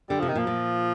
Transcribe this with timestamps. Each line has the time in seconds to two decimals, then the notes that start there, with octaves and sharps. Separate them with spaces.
0.09 D3 G3
0.19 C3 F3
0.28 D#3
0.35 A#2 F3
0.47 A#2